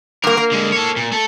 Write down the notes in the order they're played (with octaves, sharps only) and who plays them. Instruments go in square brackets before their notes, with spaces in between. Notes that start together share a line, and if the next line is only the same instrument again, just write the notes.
[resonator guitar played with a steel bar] G2 A#3 [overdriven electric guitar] A#4
[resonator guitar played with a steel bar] A#3
[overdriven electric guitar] D3 G#3
A4 C#5
A#2
A3 A4